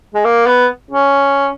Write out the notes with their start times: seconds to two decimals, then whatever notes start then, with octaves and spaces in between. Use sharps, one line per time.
0.15 G#3
0.25 A#3
0.47 B3
0.91 C#4